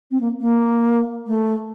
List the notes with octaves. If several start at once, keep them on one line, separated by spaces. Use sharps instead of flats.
C4
A#3
A#3
A3